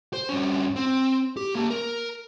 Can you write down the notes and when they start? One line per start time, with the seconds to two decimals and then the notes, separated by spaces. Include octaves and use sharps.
0.13 C5
0.29 G2 C#4
0.76 C4
1.37 G4
1.55 A#3 A5
1.70 A#4